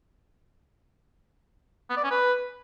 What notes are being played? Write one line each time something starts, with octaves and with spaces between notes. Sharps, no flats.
B3
D5
C#4
B4